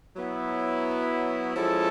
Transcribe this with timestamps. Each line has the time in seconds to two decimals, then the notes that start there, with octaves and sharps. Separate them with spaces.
0.16 F#3 B3 E4
1.54 F3 G#3 C#4 E4 A4